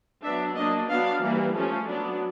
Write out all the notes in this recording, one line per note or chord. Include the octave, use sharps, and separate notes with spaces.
F#3 B3 D4 E5
F#3 A#3 D4 D#5
F#3 B3 D4 F5
E3 G3 A#3
F3 A3 C#4
F#3 B3 D4